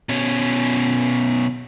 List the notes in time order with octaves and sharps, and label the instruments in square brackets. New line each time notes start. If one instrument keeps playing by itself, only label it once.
[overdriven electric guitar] B2 C#4